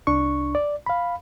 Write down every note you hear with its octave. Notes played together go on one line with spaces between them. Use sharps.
C2 D4 C#6
D5
F5 B5